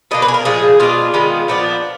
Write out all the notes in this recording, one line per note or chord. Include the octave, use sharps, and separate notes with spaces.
B2 A#3 D4 D#5
B4
G#4
A#4
A#2 F3 G#3 G#4
B2 G#3 D4 F4
D#3 G#3 B3
A#2 F3 B3 D4